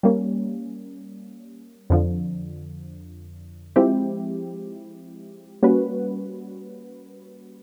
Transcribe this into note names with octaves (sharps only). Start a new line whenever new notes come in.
G3 A#3 C#4
F2 D3 F3
F3 G#3 C4 E4 G4
G3 A#3 C#4 F#4 B4